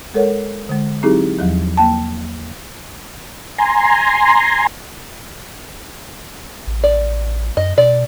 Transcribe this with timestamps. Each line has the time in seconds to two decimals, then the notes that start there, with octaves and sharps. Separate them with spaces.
0.14 G#3 A4 A#4 C#5 F#5
0.69 D3 G#3
1.03 F#3 C4 D#4 E4 G4 G#4
1.38 E2 F3 F#3
1.77 A#3 G5 A5
3.58 G#5 A#5 C6
6.67 A1
6.84 D5
7.57 F#2 D#5
7.78 B2 D5